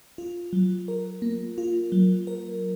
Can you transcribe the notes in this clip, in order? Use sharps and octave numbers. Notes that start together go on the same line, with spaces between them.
F4
F#3
A#4
A#3
F4
F#3
A#4